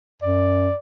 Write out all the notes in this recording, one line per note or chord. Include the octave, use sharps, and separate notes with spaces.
F#2 D5